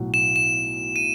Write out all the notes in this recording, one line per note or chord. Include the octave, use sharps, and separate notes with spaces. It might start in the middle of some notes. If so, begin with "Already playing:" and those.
Already playing: B1 A2 F#3
E7
E7
D#7